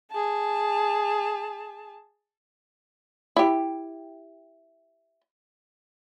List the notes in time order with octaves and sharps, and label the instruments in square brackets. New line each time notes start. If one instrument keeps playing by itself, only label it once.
[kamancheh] G#4 A5
[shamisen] E4 G4